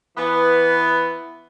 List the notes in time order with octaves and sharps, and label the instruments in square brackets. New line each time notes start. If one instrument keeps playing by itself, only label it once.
[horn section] E3 B3